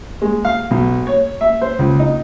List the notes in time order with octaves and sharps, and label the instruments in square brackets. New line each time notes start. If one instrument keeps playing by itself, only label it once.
[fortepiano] G#3
F5
B1
C#5
E5
C5
C#2
D#4